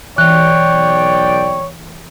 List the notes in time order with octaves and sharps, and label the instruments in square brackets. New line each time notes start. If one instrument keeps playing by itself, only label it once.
[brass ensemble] B1 D5 G5 [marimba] E3 [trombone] C#5 [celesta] F#6